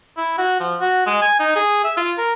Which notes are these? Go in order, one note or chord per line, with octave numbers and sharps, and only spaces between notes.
E4
F#4
F3
F#4
G#3
G#5
D#4
G#4
E5
F4
A#4